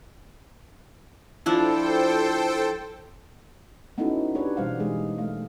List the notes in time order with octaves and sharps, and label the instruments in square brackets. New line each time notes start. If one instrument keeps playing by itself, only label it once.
[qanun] F3 D4 E4 [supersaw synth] A4 C5 G5
[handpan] B3 C#4 D#4 E4 F#4 A4
D4 G4 B4 C#5
B2 E3 G3 C5 F5 F#5
E3 G#3 D#4 G#4
A3 F5